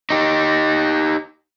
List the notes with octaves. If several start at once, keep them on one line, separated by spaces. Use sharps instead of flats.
D#4 G4